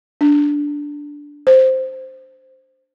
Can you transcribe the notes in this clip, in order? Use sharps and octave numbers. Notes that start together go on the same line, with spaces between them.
D4
C5